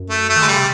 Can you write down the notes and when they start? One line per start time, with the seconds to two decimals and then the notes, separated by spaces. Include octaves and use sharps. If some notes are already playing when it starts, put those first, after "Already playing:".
Already playing: F#2
0.10 A3
0.29 A3
0.36 D#3
0.42 D3 G#3
0.47 C#3 G3
0.58 C3